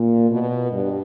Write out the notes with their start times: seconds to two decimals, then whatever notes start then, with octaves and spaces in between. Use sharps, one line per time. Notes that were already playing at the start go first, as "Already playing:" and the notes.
Already playing: A#2
0.30 B2
0.72 G2